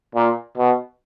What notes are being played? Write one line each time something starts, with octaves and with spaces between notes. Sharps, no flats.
A#2
B2